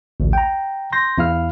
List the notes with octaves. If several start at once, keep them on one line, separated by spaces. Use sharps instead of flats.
A1 D2
G5 A#5
C6 G6 A#6
E2 E4 F5 F6